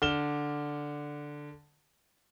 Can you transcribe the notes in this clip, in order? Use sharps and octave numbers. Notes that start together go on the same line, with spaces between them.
D3 F6 E7 G7